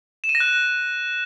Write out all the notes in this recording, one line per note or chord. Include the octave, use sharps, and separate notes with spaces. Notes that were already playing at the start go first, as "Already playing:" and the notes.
E7
D#7
A#6
F#6